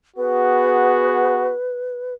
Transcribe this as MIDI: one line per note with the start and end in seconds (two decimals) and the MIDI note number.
0.17 1.54 59
0.17 1.54 66
0.17 1.54 68
0.17 2.14 71